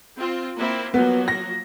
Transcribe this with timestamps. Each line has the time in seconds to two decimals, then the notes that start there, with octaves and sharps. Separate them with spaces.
0.17 C4 F4
0.58 A#3 C4 E4
0.94 F3 F#3 A#3 B3
1.28 A#6